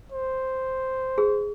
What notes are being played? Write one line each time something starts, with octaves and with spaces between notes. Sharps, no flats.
C5
G#4